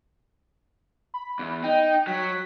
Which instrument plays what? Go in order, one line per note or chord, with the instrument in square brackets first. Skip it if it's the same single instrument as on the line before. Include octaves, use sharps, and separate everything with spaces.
[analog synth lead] B5
[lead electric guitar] E2
[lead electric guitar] D#4 [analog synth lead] G5
[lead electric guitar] F#3 [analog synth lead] B6